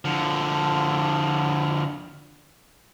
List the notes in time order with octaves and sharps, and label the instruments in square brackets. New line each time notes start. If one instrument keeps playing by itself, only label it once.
[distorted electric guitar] D3 F3